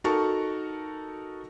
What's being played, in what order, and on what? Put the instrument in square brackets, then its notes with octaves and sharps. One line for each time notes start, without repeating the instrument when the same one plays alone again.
[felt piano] D#4 F#4 A4 A#4 A5 C#6